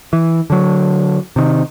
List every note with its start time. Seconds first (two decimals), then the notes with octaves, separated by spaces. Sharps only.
0.13 E3
0.50 D3 F#3
1.36 C3 D#3